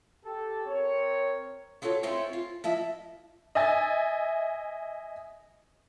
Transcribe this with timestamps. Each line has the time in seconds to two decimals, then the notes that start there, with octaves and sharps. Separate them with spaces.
0.25 G4 A4
0.67 C4 A#4 C#5
1.82 B3 F4 F#4 A4 C#5
2.03 C4 C#4 E4 F4 C5 C#5
2.33 F4
2.64 F3 E4 D#5 E5
3.55 D#5 E5 G#5 A6